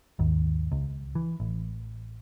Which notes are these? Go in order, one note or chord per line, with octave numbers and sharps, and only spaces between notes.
G#1 D#2
C#2
E3
A1